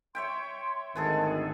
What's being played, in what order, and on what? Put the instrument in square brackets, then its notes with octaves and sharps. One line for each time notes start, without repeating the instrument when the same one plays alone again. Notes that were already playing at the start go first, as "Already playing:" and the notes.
[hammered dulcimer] C#5 E5 G5 [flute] C6
[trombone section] G#1 D2 D#3 [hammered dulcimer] B3 G#4 A4